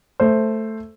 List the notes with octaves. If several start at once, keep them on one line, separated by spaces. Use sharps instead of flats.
A3 C5